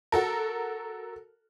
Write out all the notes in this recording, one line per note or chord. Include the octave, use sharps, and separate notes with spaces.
F#4 A4 A#4